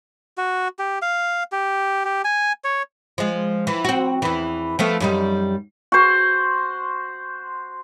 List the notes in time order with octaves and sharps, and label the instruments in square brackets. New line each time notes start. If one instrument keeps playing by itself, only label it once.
[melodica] F#4
G4
F5
G4
G4
G#5
C#5
[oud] F3 G#3
E3
C4 F#4
E2 E3
F3 A3 B3
F#2 G3 D#4
[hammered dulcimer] F#4 C5